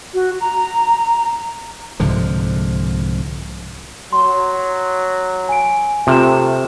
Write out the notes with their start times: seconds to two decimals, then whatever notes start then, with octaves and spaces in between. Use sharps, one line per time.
0.14 F#4
0.41 A#5
2.00 C2 G#2 D3 F3
4.13 F#3 C6
5.49 G#5 D7
6.07 C3 A3 F4 F6 E7